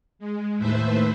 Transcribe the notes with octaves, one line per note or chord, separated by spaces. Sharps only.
G#3
D#2 A2 A3 B4 C5 E5